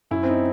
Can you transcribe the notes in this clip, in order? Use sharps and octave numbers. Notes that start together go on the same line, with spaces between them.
F#2 E4
C4
D#4